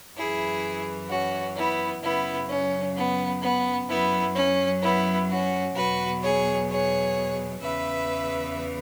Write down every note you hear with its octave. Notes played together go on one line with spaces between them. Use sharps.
F#2 E3 E4 G#4
C#4 F#4
B3 E4
F#2 C#3 F#3 B3 E4
C#4
B3
B3
F#2 F#3 B3 E4
C#4
B3 E4
C#4 F#4
E2 B2 F#3 F#4 B4
G#4 C#5
G#4 C#5
E2 C#3 E3 B4 E5